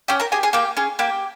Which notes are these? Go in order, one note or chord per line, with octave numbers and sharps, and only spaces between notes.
C#4 G4 G5
A#4 A#5
G4 G#4 G#5
G#4 G#5
A#3 G4 G5
C#4 G#4
A#3 G4 G5